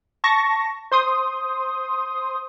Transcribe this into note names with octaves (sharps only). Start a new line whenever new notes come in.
A5 C#6 A#6
C5 C6 D#6